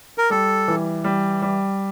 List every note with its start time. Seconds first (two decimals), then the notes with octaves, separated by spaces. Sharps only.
0.18 A#4
0.30 G3 A4
0.68 E3
1.04 G3
1.42 G3